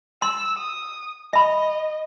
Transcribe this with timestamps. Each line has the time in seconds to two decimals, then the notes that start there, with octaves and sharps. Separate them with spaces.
0.22 C6 E6
0.57 D#6
1.33 D#5 E5 B5